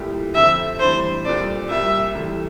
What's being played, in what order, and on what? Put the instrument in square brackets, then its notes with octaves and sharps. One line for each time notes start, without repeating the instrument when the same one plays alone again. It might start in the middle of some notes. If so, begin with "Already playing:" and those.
Already playing: [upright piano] C2 A#2 A3 E4 G4
[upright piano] F2 D3 A3 C4 [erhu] E5
[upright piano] A2 E3 G3 D4 [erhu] C5
[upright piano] C2 A#2 A3 C4 [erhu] D5
[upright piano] C2 C3 G3 A#3 [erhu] E5
[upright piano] C2 C3 E3 A3